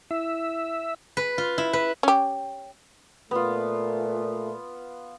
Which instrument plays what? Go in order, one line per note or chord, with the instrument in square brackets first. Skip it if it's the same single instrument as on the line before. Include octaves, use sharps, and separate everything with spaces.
[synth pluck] E4 [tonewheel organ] E5
[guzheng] B4
F4
E4
B4
[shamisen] C#4 G4
[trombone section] A#2 A3 [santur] B3 F4